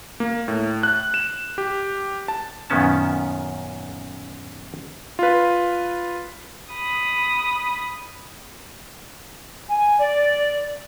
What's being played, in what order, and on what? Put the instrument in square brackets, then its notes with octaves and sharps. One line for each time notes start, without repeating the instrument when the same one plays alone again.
[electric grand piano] A#3
A2
F#6
E7
G4
A5
[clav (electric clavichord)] F#2 A#2 D#3 B3 C#4 A5
[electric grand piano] F4 B4
[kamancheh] B5 D#6
[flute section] G#5
D5